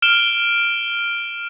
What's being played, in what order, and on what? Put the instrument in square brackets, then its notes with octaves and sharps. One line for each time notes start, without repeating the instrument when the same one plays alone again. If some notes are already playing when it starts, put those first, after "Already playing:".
[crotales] F6 D7 E7 G7